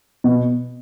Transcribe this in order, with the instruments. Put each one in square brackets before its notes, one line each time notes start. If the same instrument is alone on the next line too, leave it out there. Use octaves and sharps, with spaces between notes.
[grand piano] B2